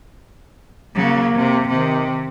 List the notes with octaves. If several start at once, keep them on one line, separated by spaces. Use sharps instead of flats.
C#3 F#3 A#3
C3
C3 D#3